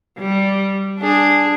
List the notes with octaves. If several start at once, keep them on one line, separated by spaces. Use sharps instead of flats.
G3
D4 G#4